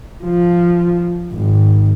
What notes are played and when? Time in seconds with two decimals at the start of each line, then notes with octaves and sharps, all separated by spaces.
0.24 F3
1.32 G#1